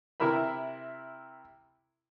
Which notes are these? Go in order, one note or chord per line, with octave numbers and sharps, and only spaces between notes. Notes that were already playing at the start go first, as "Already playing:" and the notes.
C3 E4 A#4 E5 B5